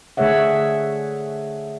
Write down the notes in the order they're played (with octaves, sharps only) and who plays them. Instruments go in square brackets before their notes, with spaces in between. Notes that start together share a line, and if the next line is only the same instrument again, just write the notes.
[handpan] D3 A3 G#4 C#5 E5 F#5